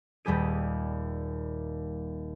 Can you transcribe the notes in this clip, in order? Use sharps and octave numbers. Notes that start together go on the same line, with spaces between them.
D#1 D#2 G3 G4 G#4 D#7